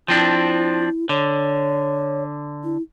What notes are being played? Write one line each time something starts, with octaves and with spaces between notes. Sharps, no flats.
F3 C4 D4 E4
D3 C#5
E4